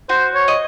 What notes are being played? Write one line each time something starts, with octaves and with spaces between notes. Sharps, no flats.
F#4 C5
C#5
D#5